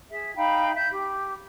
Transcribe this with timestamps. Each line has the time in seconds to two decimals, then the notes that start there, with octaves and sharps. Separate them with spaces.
0.11 G#4 E5
0.36 D#4 F5 G5 B5
0.74 E5 G6
0.91 G4